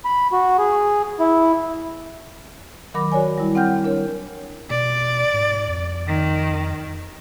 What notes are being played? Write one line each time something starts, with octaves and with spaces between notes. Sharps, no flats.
B5
F#4
G#4
E4
D#3 F#3 A#4 B5 D6 A#6
F#4 A#4 C#5 D5 G#5
G3 E4
C4 F#5 G5 F6 G6
D4 A#4 C#5
B2 D5
G#2
F2
D#3